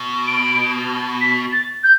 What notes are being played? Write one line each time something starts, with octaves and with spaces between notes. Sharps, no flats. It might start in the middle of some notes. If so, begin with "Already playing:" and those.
Already playing: B2
D7
B6
A6
G6